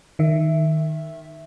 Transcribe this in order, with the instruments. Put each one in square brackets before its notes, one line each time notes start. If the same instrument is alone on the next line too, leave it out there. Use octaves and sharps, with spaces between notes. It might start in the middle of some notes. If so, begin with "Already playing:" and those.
[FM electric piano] D#3 E5